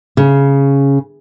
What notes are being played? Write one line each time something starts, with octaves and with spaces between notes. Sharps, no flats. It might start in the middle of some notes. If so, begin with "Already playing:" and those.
C#3